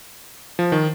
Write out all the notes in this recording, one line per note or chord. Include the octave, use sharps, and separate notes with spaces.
F3
D#3